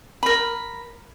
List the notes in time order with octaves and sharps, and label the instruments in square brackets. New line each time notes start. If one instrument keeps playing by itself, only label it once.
[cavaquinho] A#4 B5